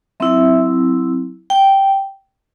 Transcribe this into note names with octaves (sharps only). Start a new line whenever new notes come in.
F#3 C4 E4 E5
G5